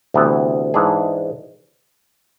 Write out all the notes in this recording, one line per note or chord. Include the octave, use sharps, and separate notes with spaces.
D2 C3 E3 B3
G#2 E3 G#3 D4 G#4